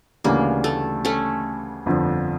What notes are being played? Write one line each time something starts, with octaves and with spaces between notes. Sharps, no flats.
D2 C#3 E3 G3 A#3 D4
A3
A3 C#4
G1 F2 D3 F3